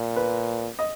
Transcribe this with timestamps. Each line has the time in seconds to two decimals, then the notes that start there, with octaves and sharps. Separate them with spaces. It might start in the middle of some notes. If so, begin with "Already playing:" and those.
Already playing: A#2
0.16 B4
0.79 D#5